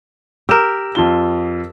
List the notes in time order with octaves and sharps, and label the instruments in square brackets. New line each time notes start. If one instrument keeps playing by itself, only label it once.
[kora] G4 A#4 [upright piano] E6 E7
[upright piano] F2 F4 G7